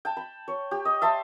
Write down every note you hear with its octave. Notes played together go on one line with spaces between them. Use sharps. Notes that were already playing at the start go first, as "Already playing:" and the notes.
G5 A5
B5
C#5
G4
D#5
E5 A5 C6